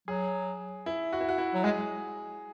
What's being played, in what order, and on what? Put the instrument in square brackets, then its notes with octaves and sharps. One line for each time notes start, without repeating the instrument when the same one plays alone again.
[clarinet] F#3 [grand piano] G#4
[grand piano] E4
F#4
E4
F#4
E4
[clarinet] F#3
[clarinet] G#3 [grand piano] G#4